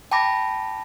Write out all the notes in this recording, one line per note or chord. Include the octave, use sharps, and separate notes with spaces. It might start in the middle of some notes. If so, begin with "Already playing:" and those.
G5 A5 B5 D6 A#6